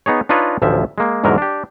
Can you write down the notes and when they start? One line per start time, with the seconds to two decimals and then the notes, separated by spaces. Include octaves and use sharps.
0.06 B3 D#4 G#4 C#5
0.29 D4 D#4 F4 B4 C#5 D#5
0.62 A1 D2 F3 E5
0.98 G#3 A#3
1.24 E2 G#2 D3 F#3 A#4
1.38 D4 G4